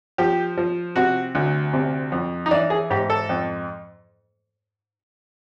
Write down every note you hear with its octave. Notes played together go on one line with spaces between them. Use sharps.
F3 G4
F3
C3 F#4
D2
C3
F2
D#4
E3 D4
G#4
G#2 G4
A4
F2